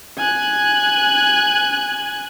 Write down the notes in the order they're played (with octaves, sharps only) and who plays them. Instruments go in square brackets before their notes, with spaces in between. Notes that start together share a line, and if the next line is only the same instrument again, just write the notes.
[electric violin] G#5 F#6